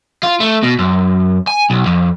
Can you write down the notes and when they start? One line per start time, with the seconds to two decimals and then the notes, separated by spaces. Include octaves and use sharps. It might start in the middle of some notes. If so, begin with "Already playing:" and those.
0.23 F4
0.40 A3
0.63 B2
0.79 F#2
1.47 G#5
1.70 B1
1.86 F2